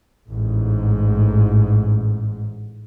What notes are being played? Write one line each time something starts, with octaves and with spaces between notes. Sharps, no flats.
A1 G#2